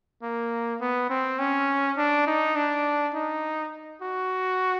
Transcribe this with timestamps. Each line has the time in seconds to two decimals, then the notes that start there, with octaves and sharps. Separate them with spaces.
0.23 A#3
0.81 B3
1.10 C4
1.39 C#4
1.97 D4
2.27 D#4
2.56 D4
3.14 D#4
4.02 F#4